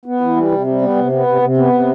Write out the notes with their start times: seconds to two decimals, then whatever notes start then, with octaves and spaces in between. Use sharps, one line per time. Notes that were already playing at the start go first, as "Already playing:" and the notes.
0.06 B3
0.21 E3
0.36 G3
0.51 C3
0.67 G3
0.82 B3
0.96 C3
1.12 B3
1.26 C3
1.42 C3
1.57 B3
1.72 C3